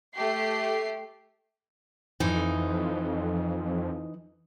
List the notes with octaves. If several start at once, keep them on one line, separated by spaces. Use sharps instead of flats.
A3 G4 C7
F2 E3 D#4